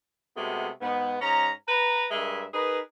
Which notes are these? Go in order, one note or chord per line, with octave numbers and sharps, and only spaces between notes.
C3 G#3 A3 B3 F#4
G#2 B3
G#2 C#4 A#5
B4 A#5
G2 G#3 A#4 E5
D#4 G#4 A#4 B4